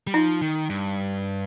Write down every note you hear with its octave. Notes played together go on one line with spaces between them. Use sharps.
G3
F3 D#4
D#3
G2